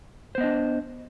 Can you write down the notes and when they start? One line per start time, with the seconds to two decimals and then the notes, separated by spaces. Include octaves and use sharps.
0.35 C5
0.38 B3
0.41 D#5
0.44 D4